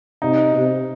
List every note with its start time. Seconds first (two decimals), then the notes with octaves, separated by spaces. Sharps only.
0.22 C3 D#4
0.54 C3